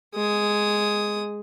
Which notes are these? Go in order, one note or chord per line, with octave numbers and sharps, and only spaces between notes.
G#3 D#6